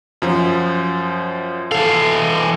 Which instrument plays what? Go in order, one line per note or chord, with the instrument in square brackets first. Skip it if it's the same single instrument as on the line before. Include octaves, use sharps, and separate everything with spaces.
[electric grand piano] F#2 F3
[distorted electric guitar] E3 F5 [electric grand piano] A4